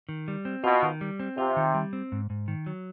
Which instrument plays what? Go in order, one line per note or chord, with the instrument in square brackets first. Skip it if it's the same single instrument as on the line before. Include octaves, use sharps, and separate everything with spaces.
[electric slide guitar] D#3
G3
C4
[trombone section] B2 [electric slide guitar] F4
[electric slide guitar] D#3
G3
C4
[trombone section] C3 [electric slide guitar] F4
[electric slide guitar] D#3
G3
C4
G#2
G#2
D#3
F#3